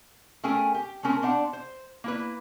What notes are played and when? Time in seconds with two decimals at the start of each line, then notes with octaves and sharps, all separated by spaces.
0.44 A3 C#4 G#4 A#4 G5 G#5
0.74 G4
1.03 A3 C4 C#4 A#4
1.22 B3 C4 D4 F5 F#5 A5
1.53 C5
2.04 A#3 E4 B4